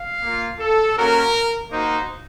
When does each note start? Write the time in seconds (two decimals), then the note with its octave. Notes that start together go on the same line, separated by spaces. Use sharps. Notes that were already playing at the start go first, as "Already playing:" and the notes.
Already playing: F5
0.22 A#3 F4
0.59 A4
0.97 A#3 C#4 F#4 A#4
1.71 A#3 D#4 F#4 C5